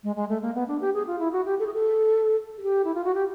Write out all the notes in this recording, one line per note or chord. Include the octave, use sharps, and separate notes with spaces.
G#3
G#3
A3
A#3
B3
D4
G4
G#4
F4
E4
F#4
G4
A4
G#4
A4
G#4
G4
E4
F4
F#4
G4